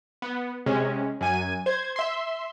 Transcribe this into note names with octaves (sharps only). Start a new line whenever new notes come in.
B3
C3 G#3 C#4
F#2 G#5 D#7
C5 G#6
E5 C6